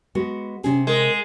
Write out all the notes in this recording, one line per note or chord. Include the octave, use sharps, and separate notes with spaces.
G#3 B3 F#4
C3 C#4 G#4
G#3 A#4